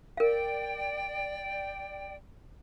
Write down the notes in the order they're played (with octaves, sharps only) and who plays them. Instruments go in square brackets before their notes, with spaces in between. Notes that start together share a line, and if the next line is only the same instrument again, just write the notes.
[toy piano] A#4 F5 [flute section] D5 G5